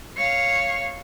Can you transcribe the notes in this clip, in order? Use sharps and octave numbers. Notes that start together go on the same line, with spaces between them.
C#5 F5